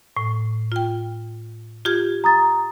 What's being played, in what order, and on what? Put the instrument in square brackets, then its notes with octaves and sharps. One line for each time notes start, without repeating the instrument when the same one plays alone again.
[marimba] A2
F4 G5
F4 G4 G#6
[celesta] A#5 D#6 A6